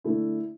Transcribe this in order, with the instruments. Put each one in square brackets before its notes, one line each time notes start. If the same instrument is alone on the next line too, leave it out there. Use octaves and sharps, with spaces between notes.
[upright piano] D3 A3 E4